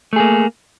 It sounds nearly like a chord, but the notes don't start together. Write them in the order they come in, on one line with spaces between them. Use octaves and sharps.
A3 G#4 A#3